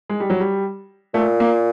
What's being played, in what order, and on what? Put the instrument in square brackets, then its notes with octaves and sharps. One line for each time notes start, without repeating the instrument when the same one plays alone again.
[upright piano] G#3
G3
F#3
G3
[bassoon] A#2 [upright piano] A3
[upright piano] A#3